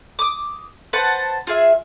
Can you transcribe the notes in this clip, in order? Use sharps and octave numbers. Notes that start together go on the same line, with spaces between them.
D6 D#6
B4 C5 F#5 A5
F4 G#4 E5